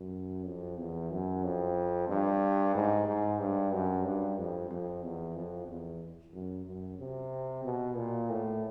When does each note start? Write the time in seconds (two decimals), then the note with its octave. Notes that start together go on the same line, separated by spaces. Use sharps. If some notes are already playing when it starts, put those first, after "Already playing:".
Already playing: F#2
0.46 F2
0.78 E2
1.11 F#2
1.44 F2
2.08 G2
2.75 G#2
3.07 G#2
3.40 G2
3.73 F#2
4.05 G2
4.38 F2
4.70 F2
5.03 E2
5.36 F2
5.68 E2
6.33 F#2
6.65 F#2
6.99 C3
7.64 B2
7.96 A#2
8.30 A2